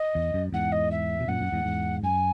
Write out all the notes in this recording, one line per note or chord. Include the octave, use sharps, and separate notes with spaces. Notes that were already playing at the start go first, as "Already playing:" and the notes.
Already playing: D#5
E2
F#2
E2 G#2 F#5
D#5
E5
B2
F#2 A#2 F#5
F#2
E2 G#2
E2 G#2
F#2 G#5